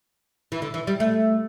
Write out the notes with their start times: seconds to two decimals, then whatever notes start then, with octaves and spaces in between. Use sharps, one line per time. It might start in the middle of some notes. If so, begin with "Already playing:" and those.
0.52 E3
0.62 D3
0.74 E3
0.87 G3
1.00 A3